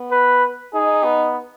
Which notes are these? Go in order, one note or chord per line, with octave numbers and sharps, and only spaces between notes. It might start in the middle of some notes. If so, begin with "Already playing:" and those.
Already playing: B3
B4
D#4 G#4
B3